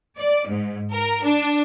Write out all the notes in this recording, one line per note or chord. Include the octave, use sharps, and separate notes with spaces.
D5
G#2
A#4
D4